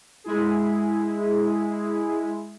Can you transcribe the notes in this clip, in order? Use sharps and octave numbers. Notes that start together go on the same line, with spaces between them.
G#3 E4 G#4